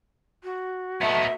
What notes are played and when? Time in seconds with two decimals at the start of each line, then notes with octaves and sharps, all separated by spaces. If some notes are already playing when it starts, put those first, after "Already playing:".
0.43 F#4
1.01 A3 B3 D#4 E5